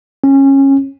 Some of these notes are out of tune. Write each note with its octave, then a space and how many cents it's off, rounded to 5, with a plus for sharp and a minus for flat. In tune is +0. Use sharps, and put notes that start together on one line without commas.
C#4 -20